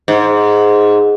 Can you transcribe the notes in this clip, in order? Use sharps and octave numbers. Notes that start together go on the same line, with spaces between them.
G#2